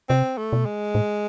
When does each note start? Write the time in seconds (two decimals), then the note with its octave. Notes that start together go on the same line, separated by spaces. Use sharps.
0.09 C3 C4
0.38 A3
0.53 B2
0.66 G#3
0.95 A2